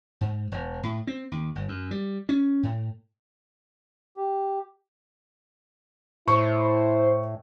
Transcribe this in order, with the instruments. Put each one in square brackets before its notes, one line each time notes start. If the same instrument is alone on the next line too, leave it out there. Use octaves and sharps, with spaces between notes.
[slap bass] G#2
E1
A2
C4
D#2
G1
F#2
G3
C#4
A2
[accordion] G4
[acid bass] A2 [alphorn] E4 [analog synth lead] C5 [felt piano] C#6